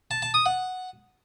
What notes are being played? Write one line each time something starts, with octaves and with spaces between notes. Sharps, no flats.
A5
A5
D#6
F#5